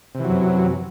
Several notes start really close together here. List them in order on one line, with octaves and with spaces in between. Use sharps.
C3 E3 F#3 F#2